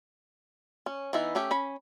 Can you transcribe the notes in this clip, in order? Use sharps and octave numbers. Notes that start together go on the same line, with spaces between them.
C#4
E3 B3 D#4 E5
A3 C#4 G4 E5
C#4 B5